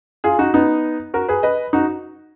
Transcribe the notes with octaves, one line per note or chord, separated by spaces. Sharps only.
F4 G#4
D#4 F#4
B3 D#4
F#4 A#4
G#4 B4
B4 D#5
D#4 F#4